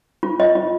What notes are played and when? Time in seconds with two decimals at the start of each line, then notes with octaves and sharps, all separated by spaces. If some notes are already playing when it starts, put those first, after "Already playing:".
0.23 F4
0.40 D#5
0.55 F4